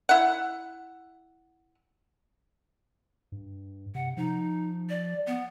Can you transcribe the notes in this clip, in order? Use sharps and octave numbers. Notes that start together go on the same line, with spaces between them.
E4 F#5
G2
C3 F#5
F3 D#4
D5
B3